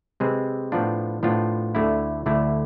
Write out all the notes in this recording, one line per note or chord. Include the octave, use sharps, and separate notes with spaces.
C3 G#3 C4 G#4 B4
A2 F3 B3 D4 F4
A2 F3 B3 D4 F4
D2 D3 A3 E4
D2 D3 A3 E4